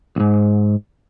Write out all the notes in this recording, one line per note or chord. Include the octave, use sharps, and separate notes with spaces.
B1 G#2